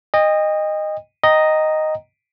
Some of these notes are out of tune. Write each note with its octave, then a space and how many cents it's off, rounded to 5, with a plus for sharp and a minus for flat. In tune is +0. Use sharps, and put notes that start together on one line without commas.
D#5 -10 G5 +40
D#5 +0 G5 -10 A#5 +0